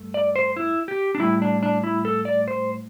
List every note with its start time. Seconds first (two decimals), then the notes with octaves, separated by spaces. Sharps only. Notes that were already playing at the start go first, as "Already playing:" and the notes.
Already playing: G2 A3
0.14 D5
0.36 C5
0.57 E4
0.88 G4
1.15 D4
1.20 A2 G3 E4
1.42 D4
1.63 D4
1.84 E4
2.05 A4
2.25 D5
2.48 C5